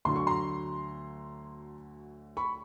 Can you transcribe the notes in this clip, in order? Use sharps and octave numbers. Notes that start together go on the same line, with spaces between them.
D2 D3 F#3 C6
C#6
A#5 C6
B5 C#6